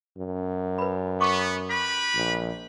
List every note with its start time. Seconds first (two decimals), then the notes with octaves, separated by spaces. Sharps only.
0.17 F#2
0.78 B4 B5
1.21 B3 C#6 D6
1.69 G4 B4 B5
2.15 A#1